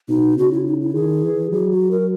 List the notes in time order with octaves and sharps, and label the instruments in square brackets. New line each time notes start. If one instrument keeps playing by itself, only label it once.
[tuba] B2 [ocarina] D#4
[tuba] C#3 [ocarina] F#4
[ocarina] E4
D#4
E4
[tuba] D#3 [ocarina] G#4
[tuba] E3
[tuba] F#3 [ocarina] G#4
[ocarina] F#4
A#4